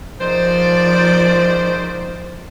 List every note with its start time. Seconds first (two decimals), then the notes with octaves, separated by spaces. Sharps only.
0.20 D#3 F3 G#3 C5 D5